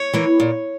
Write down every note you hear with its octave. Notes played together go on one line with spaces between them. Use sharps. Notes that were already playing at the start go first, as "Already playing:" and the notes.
Already playing: C#5
E3 A#3
A#2